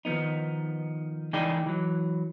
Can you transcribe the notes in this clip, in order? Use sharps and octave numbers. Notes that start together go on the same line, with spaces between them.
D#3 F3 G#3 B3 D#4
C#2 E3 D#4 G#4 D5 G5
E3 F#3